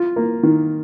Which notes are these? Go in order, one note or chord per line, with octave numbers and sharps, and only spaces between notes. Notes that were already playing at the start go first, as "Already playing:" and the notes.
Already playing: F4
A#3
D#3